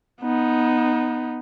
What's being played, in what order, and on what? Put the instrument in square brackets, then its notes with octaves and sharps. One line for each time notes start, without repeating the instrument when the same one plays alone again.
[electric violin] B3 D#4